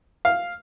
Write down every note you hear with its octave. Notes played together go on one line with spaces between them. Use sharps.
F5